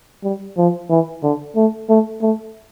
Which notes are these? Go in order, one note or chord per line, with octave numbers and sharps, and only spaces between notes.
G3
F3
E3
D3
A3
A3
A3